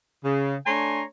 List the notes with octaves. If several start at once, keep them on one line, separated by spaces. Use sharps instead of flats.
C#3
A3 D4 C#5 G#5 A#5 C6